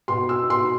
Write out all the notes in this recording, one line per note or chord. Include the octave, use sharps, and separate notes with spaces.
B2 C6
E6
B2 C6